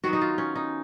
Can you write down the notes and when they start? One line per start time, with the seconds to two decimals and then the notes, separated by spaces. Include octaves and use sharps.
0.04 D#3 F#3 B3 F#4
0.13 D#4
0.21 F4
0.38 C#4
0.56 D#4